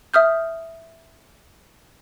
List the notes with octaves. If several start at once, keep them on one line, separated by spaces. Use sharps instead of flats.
E5 D#6 F6 G6